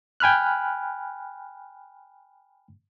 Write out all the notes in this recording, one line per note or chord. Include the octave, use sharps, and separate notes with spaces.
G5 G#5 B5 F6 F#6